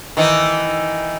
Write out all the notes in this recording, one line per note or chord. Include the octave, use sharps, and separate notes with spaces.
D#3 E3 D#4